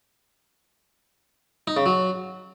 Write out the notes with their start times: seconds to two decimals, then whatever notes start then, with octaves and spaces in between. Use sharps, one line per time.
1.67 D#4
1.77 C#3
1.86 F#3